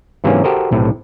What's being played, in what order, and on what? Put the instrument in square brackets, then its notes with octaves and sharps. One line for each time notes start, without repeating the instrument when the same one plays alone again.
[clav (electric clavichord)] G#2 C3 E3 F#3 A#3 C#4
F#4 G4 A4 A#4 C5 D#5
B1 A2 C3